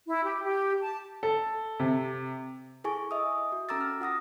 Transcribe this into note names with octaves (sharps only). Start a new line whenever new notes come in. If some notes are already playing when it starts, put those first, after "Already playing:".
E4
G4
G4
A5
A4
C3
E4 G#4 A4 G#5 C#6
D#5 E5 D#6
F#4
C#4 A4 A#5 D6 E6 A6
F6
F4 F#5 D#6 A#6